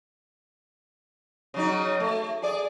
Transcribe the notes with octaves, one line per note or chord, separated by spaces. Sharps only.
C#3 F#3 D#4
A3
G#4 D5